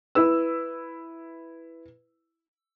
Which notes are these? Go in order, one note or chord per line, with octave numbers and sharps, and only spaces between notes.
E4 B4 E6